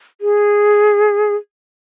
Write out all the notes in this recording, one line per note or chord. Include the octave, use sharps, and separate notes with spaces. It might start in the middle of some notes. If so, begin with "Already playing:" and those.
G#4